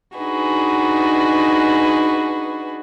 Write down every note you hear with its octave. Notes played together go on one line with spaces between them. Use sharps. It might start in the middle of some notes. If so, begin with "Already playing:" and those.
D4 D#4 F#4 G#4 B4